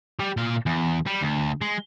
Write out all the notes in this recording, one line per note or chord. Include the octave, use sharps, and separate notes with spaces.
G3
A#2 F5
E2
G3
D2
G#3